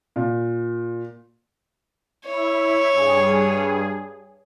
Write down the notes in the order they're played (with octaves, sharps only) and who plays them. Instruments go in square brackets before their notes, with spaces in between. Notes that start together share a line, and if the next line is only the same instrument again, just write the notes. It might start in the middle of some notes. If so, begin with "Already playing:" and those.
[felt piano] A#2
[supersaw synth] E4 [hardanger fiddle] C#5
[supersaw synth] G2 G#4